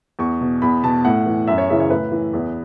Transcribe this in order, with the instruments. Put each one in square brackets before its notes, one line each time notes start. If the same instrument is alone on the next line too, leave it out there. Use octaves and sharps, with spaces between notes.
[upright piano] E2 C#6
B2
E2 B5
B2 A5
A2 F#5
E3
F#2 E5
C#5
C#3 E3 E5
C#5
A2 B4
E3
E2